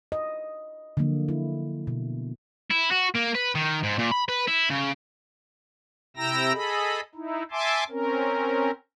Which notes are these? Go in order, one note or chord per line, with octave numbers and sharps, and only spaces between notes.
D#5
D3 F3 F#3 A#3
E4
B2
E4
F#4
A#3
B4
D#3
G#2
A#2
B5
B4
E4
C#3
C3 E4 G5 A#5 E6 A#6
G#4 A4 D#5 B5
D#4 E4
E5 G#5 A5 C6 D6
C4 C#4 A#4